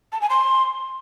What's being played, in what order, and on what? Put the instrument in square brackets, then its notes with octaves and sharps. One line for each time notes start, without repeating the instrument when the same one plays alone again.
[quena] A5
G#5
C6